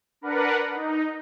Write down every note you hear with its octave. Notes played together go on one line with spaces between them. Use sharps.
D4 A#4 B4 F#5
D#4